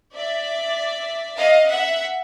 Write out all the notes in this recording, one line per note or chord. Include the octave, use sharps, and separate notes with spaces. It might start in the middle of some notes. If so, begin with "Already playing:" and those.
D5 E5
D#5 F5
E5 F#5